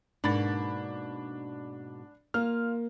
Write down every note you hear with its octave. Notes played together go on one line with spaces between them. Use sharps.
G#2 B2 A#3 D4 B5 A6
A#3 F4 F6